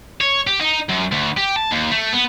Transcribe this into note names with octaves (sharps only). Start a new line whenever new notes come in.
C#5
G4
D#4
F#2
D2
G4
A5
D#2
A3
B3